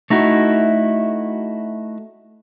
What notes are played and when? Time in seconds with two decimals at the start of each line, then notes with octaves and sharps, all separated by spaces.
0.10 A3 D#4 E4 F#4